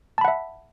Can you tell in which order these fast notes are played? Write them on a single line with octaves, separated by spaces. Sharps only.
A5 B5 F#5 E5